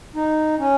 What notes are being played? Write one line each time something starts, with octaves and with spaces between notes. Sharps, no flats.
D#4
C#4